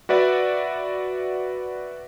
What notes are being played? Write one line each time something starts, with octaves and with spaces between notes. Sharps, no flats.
F#4 B4 D5 E5 F#5